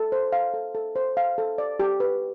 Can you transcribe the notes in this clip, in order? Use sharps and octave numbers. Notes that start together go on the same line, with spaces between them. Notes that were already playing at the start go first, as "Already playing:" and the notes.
Already playing: A4
C5
F5
A4
A4
C5
F5
A4
D5
G4
B4